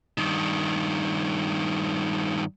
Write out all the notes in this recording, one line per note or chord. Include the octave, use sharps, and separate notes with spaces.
G2 D#3